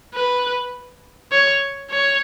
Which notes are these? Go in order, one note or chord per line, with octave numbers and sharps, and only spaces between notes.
B4
C#5
C#5